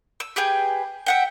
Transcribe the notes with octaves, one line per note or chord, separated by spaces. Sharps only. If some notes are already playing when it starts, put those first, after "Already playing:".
E6
G4 G#4 B4 G5
E5 F#5 G5